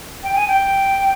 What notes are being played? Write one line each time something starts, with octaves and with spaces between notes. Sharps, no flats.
G5
G#5
G5